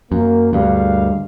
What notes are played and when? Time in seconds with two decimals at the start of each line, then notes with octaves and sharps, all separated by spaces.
0.12 F#2 A#3
0.53 D2 G2 G3 G#3 F5